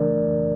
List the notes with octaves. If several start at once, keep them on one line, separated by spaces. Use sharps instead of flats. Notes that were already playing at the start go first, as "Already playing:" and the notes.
Already playing: C#3 E3 A3 D4 A#4 D5